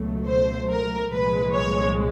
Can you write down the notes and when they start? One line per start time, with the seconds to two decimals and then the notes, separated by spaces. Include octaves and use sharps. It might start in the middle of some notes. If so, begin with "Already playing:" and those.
Already playing: C#2 B2 F#3 A3
0.28 C5
0.70 A#4
1.11 C2 A#2 F3 G#3 B4
1.54 C#5